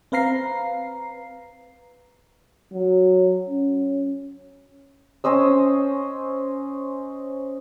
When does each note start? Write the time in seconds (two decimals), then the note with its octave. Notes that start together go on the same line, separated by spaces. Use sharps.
0.12 C4 B4 F5 A#5 C7
2.73 F#3
3.48 C#4
5.24 C#4 C5 D#5 E6